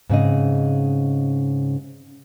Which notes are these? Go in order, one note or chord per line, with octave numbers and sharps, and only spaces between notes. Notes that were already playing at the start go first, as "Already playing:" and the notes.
G#2 C#3 C4 D#5